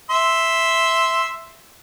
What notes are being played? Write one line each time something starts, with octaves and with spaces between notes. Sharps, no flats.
E5 C6